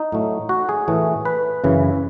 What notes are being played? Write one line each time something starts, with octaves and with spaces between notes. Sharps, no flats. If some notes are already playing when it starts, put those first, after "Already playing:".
Already playing: D#4
A2 F#3 A3
F#4
G#4
A2 E3 A3
B4
F#2 C#3 E3